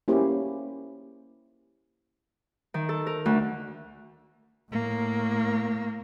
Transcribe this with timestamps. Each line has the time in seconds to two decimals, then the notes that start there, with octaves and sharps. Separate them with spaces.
0.08 A#3 C#4 E4 G4 C5
2.74 D#3
2.89 A4
3.07 A#4
3.26 D2
4.72 A2 A#3